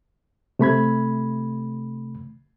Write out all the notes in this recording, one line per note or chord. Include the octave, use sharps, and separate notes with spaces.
C3 A3 B5 G#6